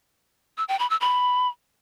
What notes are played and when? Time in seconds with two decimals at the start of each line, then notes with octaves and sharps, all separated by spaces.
0.57 E6
0.68 G5
0.79 B5
0.90 E6
1.01 B5